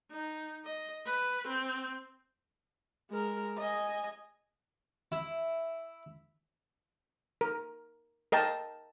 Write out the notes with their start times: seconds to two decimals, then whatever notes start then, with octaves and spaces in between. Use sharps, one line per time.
0.11 D#4
0.65 D#5
1.06 B4
1.47 C4
3.10 G#3 A#4
3.58 D#5 G#5
5.12 E4
7.41 A#4
8.32 A#4 D#5 G5 A5